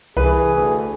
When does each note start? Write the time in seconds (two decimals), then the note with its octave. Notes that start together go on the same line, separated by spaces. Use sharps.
0.17 C2 E3 G#4 B4
0.57 D2